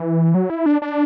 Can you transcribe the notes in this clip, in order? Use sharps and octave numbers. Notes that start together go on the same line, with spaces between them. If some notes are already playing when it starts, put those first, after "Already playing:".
Already playing: E3
F#3
E4
D4
D4